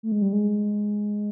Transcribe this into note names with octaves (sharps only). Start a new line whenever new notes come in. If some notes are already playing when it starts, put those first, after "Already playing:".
A3
G#3
G3
G#3